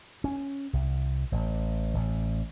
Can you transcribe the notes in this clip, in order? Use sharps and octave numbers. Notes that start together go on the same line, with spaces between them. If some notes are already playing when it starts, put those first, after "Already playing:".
C#4
C2
A1
A1